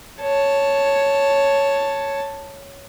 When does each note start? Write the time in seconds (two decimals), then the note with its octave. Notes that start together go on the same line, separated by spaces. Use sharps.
0.22 C#5 A5